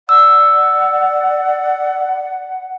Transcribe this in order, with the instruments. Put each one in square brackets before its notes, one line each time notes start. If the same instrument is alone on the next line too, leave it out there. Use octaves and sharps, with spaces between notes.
[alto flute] D5 [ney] F#5 [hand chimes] E6